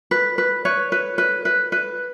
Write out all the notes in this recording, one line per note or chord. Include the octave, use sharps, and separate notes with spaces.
B4
B4
B4 C#5
B4
B4
B4
B4